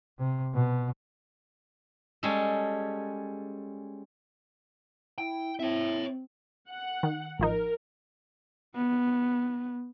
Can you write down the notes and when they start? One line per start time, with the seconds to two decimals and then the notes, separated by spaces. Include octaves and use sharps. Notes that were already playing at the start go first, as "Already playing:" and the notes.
0.19 C3
0.54 B2
2.23 G3 G#3 C#4 G#4 A4
5.18 E4 G5
5.59 C4 E4 C#5 E5
6.70 F#5
7.03 D#3
7.39 A1 F3 D#4 A#4
8.75 B3